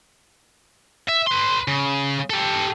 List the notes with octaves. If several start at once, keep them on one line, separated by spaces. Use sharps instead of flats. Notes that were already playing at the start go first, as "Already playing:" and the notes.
E5
B4 C6
C#3
G4 A4